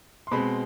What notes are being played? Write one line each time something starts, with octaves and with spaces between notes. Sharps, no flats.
C6
B2 G#3 C4 B5